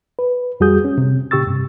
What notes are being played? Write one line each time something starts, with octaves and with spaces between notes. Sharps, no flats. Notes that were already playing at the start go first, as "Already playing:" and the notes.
B4
F2 G3 F#4 G#4 D#6 G6
C#4
C3
A#2 C#3 G4 C#6 E6 A6
G2 C3